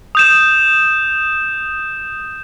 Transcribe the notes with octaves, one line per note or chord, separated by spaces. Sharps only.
D#6 G6 E7